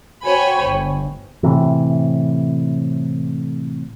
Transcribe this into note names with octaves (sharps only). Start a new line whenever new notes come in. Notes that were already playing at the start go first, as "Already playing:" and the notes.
F#4 C5 C#5 G5 G#5 B5
G1
A2 C3 E3